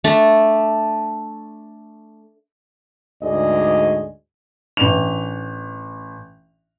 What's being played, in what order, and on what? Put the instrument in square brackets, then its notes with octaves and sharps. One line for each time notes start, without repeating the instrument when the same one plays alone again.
[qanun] A3 D4 A5
[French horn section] D2 G#2 G#4 D5 D#5
[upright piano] A1 D4 F7